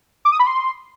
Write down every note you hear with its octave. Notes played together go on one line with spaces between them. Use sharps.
D6
D#6
B5
C6